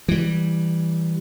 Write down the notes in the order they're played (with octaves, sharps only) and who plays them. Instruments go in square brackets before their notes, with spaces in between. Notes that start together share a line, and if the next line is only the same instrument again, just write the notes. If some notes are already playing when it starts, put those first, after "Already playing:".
[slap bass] E3 G3